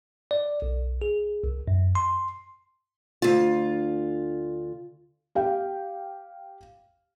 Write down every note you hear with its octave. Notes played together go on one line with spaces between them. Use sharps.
D5
B1
G#4
C2
F#2
C6
D2 F4
G4 F5 G5